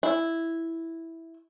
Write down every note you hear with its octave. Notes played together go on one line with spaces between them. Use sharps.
E4